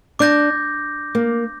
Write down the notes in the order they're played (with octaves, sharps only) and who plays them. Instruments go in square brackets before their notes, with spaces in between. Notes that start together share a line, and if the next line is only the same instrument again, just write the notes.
[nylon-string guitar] D4 [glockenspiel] D6 G6 A#6
[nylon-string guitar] A#3